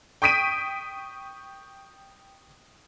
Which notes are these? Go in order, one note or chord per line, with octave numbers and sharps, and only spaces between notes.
G5 C#6 D#6 B6 D7 D#7